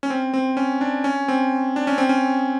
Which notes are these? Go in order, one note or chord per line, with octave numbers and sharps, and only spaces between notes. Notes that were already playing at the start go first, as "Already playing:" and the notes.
C#4
C4
C4
C#4
D4
C#4
C4
D4
C#4
C4
C#4